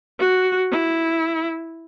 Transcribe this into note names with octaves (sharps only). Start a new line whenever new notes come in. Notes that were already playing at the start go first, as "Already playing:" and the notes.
F#4
E4